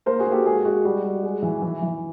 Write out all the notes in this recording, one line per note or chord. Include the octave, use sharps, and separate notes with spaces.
A#3 A#4 C5
F#4 G#4
A#3
G4 A4
G#3 F#4 G#4
G#3 F#4
G3 F#4
G3
G#3
E3
E3
E3